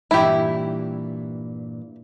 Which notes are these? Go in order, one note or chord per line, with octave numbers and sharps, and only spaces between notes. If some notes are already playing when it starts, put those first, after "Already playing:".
G2 A#2 E3 E4 G4